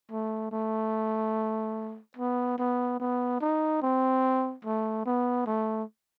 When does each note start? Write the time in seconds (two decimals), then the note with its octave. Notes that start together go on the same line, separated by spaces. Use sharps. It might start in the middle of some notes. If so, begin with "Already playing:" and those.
0.11 A3
0.52 A3
2.17 B3
2.58 B3
3.00 B3
3.41 D#4
3.82 C4
4.65 A3
5.06 B3
5.46 A3